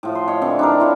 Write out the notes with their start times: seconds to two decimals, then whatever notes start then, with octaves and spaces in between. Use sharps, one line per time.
0.03 A2 F3
0.15 C6
0.28 C#5 D#5
0.42 D3 E3 C4
0.59 D4 D#4 A#4
0.80 E4 F4 C#5